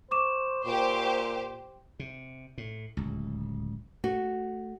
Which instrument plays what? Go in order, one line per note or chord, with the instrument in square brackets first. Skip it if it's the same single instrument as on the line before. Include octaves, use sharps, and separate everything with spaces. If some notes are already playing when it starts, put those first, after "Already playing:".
[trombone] C5 [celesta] C#6 D6 E7
[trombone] A#2 [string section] G4 C5
[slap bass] C3
A2
D1 C#2
[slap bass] A3 [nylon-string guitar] F#4